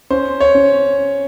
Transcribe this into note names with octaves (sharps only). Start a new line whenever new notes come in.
C#4 C5
C#5
C#4